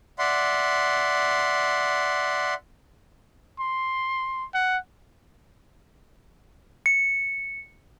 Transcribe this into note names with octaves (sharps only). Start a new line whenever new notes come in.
D5 E5 F#5 C6
C6
F#5
C#7